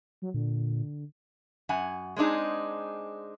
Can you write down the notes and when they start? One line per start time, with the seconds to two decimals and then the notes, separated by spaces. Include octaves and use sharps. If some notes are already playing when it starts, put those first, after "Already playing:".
0.22 F#3
0.34 A#2 D3
1.69 F#2 F#5 G#5
2.16 G#3 C4 D4 D#4 G#4